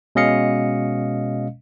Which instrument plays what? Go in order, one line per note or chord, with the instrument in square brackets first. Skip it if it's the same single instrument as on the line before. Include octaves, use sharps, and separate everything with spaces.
[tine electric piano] B2 G#3 C#4 D#5 F5 C#7